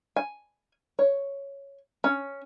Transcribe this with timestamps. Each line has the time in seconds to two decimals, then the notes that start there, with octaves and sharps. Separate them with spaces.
0.16 G#5
0.99 C#5
2.04 C#4